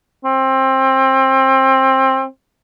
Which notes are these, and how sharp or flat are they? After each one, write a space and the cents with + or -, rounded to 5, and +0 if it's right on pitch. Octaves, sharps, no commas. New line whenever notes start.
C4 +25